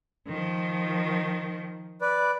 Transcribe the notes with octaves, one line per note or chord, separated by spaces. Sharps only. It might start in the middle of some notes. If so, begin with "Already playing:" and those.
D#3 F3
B4 D5